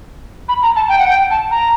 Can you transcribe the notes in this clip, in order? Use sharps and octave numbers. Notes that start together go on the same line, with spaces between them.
B5
A#5
A5
G5
F#5
G5
A5
A#5